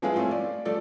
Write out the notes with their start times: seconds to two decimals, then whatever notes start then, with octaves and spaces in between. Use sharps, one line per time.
0.02 F3 G#3 B3 E4 G#4 F5
0.16 A3 C4 C#4 F4
0.31 D5
0.65 F3 A3 A4 D5